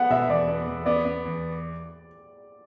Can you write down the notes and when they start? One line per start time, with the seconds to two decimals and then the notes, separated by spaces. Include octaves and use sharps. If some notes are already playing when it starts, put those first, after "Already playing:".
Already playing: B3 F#5
0.10 B2 E5
0.29 E2 D5
0.48 B3
0.67 E2
0.86 B3 D5
1.05 B3
1.25 E2